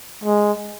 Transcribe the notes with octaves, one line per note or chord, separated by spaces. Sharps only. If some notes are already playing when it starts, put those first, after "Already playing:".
G#3